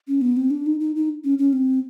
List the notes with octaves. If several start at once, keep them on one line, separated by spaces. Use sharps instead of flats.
C#4
B3
C4
D4
D#4
D#4
D#4
C#4
C#4
C4